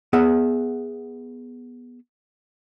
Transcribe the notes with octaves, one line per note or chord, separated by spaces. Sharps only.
B3 G#4 E5 F#5